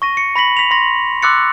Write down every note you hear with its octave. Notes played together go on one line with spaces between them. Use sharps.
C#6 A#6 D#7
C#7
B5 A#6 B6 F#7
B6 F7
C6 A#6
C6 D6 E6 F#6 A6 C#7